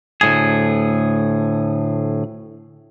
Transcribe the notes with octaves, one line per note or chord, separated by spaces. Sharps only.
D2 A2 G#4